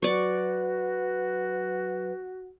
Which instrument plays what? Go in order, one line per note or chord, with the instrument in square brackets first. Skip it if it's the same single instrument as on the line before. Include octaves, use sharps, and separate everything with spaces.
[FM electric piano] F#3 [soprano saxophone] F#4 [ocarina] B4 [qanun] D5 C#6